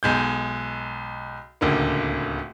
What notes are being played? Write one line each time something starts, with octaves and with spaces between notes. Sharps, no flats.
B1 G#3 G6
D1 C#2 D3 A#3